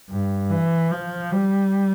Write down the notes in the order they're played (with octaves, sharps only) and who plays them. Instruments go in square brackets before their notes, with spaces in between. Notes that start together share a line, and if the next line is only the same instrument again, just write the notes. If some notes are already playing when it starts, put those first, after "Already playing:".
[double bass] G2
E3
F3
G3